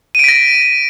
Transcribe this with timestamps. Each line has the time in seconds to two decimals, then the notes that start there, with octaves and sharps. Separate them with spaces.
0.15 D#7
0.19 D7
0.24 B6
0.28 A#6